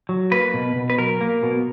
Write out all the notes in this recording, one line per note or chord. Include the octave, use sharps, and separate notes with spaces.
F#3
A#3 B4
B2
B2
B4
F#3 A#4
A#3
B2